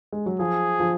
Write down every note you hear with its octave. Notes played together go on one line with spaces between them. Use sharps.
G#3
F#3
F3 G#4
F3